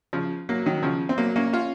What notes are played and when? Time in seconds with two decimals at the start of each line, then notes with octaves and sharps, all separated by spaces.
0.13 C#3 F3
0.49 F#3 A#3
0.66 D#3 F#3
0.83 C#3 F3
1.09 C4
1.18 F#3 A#3
1.36 A#3 C#4
1.53 C#4 F4